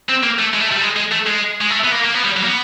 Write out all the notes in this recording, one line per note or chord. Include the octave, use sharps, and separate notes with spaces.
C4
A#3
A3
G#3
A3
G3
G#3
G#3
A3
G#3
G#3
A3
B3
A#3
A#3
B3
G3
F#3
A#3
B3